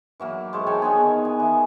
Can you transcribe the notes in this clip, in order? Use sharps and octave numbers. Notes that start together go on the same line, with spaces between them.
E3 F#3 A#3
G#3 C5 C#6
A4 C#5 G5 G#5
D#3 B3 D4 G#4
G#5
E3